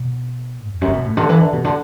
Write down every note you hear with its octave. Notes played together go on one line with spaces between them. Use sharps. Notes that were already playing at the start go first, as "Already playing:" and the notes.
Already playing: B2
E2
F#2
D3
B2
A2
D3
E3
D3
B2
D3